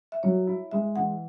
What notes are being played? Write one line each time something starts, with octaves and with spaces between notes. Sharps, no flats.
E5
F#3 C#5
E4
G#3 E5
E3 F#5